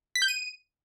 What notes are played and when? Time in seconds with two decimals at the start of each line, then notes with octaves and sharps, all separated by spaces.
0.15 B6
0.22 G6
0.28 D#7